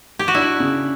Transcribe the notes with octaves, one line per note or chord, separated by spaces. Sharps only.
G4
F#4
D4 E4
C#3